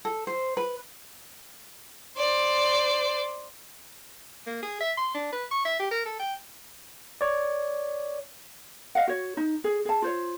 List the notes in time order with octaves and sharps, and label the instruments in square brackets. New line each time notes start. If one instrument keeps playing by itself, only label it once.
[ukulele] A4
C5
B4
[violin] C5 D5
[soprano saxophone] A#3
G#4
E5
C6
D4
B4
C#6
E5
G4
A#4
A4
G5
[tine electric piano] C#5 D5
[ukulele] D#5 F5 F#5
F#4 C#5
D#4
G#4
G#4 A5
F4 C5 C#5